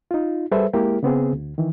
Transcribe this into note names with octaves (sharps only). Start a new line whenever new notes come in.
D#4 F4
G3 G#4 A4 B4 C5 E5
G#3 A#3 E4 G4 A#4
C#3 B3 C4 G#4
D2
D#3 E3